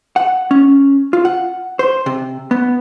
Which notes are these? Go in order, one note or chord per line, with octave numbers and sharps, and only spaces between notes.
F#5
C#4
F4
F#5
C5
C3
B3